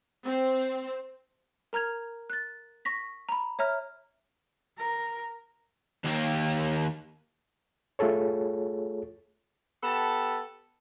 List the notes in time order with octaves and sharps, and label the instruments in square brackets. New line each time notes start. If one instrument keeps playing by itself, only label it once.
[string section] C4
[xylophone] A#4 A#5 F6 G#6 F7
F#6 A6
C#6 A#6 B6
A#5 B5
C#5 E5 A#5 F6
[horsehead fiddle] A#4
[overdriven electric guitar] D#2 A#3
[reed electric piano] A3 F4 G#4 A4 C#5
[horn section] B3 G4 A4 A5